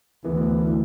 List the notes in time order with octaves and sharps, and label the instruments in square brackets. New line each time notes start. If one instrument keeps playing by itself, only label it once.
[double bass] D2 [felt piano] E3 B3 [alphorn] E4